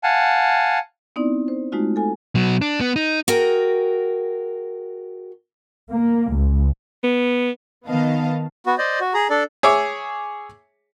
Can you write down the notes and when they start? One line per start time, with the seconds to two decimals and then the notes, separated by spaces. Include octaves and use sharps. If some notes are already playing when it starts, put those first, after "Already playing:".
0.03 F5 F#5 G#5 A5
1.16 B3 C4 D#4 E4 D5
1.48 C5
1.72 G#3 A3 D#4 F4 F#4
1.96 A4 G#5
2.35 B2 F#3
2.61 D4
2.81 B3
2.96 D#4
3.28 F#4 G#4 A#4 G5
5.92 A#3
6.34 C#2
7.04 B3
7.87 D#3 B3 D#5 F5 A5
8.66 B3 F#4
8.78 C5 D5 D#5
9.00 F#4
9.14 G#4 A#5
9.30 D4 A4 D5
9.63 G#4 C#5 E5 D6